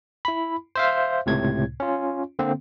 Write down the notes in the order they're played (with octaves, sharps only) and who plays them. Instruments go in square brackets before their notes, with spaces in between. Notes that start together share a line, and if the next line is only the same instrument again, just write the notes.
[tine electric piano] E4 B5
C5 E5 F5
C#2 A2 C3 G#6
C#4 F4
D3 A#3 C4